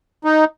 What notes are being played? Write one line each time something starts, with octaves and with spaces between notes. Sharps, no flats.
D#4